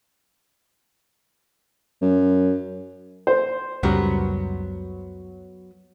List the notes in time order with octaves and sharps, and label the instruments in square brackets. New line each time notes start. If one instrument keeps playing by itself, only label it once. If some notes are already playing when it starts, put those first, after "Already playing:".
[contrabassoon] F#2
[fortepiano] C5
[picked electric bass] C#2 F#2 G3 [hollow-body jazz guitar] F#3 B3 A#4